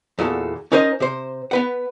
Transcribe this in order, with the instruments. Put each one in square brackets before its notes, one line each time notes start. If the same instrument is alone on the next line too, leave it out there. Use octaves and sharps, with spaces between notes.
[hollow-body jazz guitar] E2 A#2 F#4 A4
C#4 D#4 A#4 C5 D#5
C3 C5
B3 B4 F#5